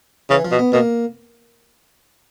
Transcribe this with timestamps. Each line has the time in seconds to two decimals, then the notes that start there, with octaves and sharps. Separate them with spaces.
0.30 C#3 E3
0.45 F3
0.52 B2
0.59 B3
0.73 B2 A#3